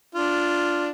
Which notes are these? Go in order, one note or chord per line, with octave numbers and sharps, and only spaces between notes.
D4 F4